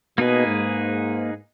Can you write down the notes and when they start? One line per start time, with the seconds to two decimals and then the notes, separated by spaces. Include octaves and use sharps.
0.18 B2 A#3 D#4 G#4 B4
0.46 G#2